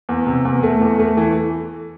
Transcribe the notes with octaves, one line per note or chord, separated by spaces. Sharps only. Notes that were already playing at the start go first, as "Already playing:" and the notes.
E2
C3
E2
A3
E2
A3
E3